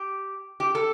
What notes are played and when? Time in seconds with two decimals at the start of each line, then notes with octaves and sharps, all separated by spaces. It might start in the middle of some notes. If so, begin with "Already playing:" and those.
Already playing: G4
0.60 G4
0.75 A4